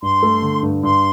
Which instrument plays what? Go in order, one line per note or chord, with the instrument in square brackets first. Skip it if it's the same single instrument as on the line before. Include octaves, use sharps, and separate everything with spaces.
[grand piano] G2 [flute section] C6
[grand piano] A3
D3
G2
[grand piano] G2 [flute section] C6